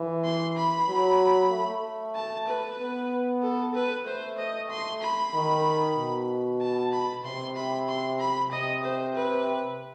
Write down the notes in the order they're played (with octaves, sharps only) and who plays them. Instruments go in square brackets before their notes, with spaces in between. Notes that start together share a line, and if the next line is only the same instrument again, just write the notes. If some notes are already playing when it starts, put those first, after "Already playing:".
Already playing: [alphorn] E3
[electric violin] C6
B5
[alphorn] F#3
A3
[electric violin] A5
B4
[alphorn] B3
[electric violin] A4
B4
[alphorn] A3 [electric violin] C5
[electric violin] D#5
C6
B5
[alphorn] D#3
B2
[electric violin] A5
B5
[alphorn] C3 [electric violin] C6
[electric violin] B5
C6
B5
[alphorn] C3 [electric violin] D#5
[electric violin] C5
B4